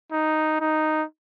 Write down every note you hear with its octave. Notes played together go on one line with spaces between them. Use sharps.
D#4
D#4